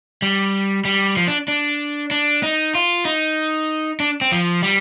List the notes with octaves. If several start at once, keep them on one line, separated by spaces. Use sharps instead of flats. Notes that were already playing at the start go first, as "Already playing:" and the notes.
G3
G3
F3
D4
D4
D4
D#4
F4
D#4
D4
C4
F3
G3